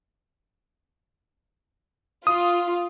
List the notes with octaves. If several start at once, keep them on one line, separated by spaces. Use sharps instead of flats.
F4 D#6